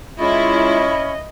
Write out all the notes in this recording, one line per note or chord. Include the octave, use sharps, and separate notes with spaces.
G#3 C#4 E4 F4 D#5 B5 C#6